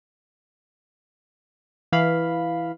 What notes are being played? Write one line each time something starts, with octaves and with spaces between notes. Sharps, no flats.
E3 F5 B5